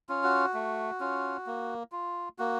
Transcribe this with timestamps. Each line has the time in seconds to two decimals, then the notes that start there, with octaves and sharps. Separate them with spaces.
0.09 C#4 F4
0.24 F#4
0.54 A3
1.00 C#4 F4
1.46 A#3
1.92 F4
2.39 A#3 F#4